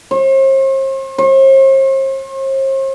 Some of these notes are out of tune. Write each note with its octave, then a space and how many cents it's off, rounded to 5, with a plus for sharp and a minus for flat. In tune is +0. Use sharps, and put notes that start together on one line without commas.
C5 +45
C5 +45